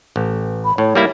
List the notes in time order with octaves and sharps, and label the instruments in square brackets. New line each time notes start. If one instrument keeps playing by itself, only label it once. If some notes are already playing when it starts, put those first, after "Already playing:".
[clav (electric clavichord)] A1
[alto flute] B5
[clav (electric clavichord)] A2 [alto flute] C#5
[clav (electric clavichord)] G3 A#3 E4